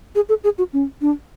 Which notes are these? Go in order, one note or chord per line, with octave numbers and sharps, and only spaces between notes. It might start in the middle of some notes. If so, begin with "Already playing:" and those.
G#4
A4
G#4
F#4
C#4
D4